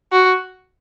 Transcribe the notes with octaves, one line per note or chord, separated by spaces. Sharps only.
F#4